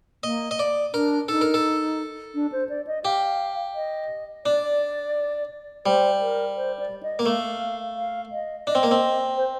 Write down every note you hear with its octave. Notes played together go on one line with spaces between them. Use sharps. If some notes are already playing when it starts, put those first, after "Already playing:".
A#3 D#5
D#5
D5
D4 A#4
D#4 A4
A#4
A4
D4
C5
D5
D#5
G4 F5
D#5
D4 D5
G3 C5
A#4
C5
D5
D#5
A#3
A3 F5
F5
D#5
D4 D#5
C4
A#3
C4
C5